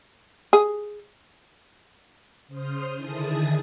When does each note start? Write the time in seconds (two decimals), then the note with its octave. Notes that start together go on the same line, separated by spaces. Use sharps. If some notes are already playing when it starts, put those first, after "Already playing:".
0.53 G#4
2.48 C#3 C5 C6 D#6 F6
2.96 D3 D#3 E4 G#4 A5 D#6